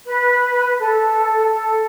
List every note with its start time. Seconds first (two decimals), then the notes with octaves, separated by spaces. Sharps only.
0.06 B4
0.79 A4
1.52 A4